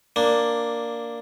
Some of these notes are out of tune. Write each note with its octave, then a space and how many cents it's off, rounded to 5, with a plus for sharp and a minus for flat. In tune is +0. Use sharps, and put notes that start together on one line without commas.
A#3 +0 D4 +0